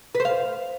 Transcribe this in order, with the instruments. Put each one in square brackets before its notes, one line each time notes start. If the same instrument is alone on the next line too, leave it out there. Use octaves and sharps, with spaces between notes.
[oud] B4
C5
F5